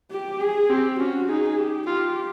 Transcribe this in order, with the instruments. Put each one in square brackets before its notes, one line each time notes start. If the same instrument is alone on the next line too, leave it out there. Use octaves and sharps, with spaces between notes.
[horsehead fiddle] G4
G#4
[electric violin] C4 [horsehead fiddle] G4
[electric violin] C#4 [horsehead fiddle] F#4
[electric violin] D#4 [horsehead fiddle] G#4
[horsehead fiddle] G4
[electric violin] F4 [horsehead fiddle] G4